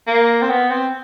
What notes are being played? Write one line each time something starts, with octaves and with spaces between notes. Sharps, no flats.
A#3
C4
B3
C4